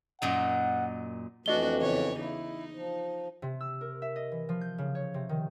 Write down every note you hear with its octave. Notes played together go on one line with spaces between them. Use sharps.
F#2 A#2 D#4 F#5
F2 E3 A3 D4 F#4 D#5 G7
E2 C#3 C#5
D#4 E4
F3
C3
E6
A#4
E5
D#5
E3
F3
G6
C#3
C#5
C3
D#3